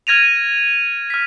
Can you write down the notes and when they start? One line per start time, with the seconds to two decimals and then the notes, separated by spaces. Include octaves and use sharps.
0.07 F6 G#6 A#6 D#7 F7
1.10 F6 B6